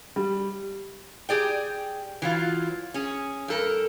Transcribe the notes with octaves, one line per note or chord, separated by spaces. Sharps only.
G3
G4 G#4 D5 G5
E3 F#3 F4
C#4 G#4
G2 A4 A#4